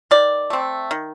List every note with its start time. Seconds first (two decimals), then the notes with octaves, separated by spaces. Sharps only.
0.11 D#3 D5
0.50 A3 C4
0.91 D#3